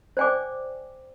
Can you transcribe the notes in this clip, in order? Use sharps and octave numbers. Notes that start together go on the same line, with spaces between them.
C5 D5 G5 G#5 D6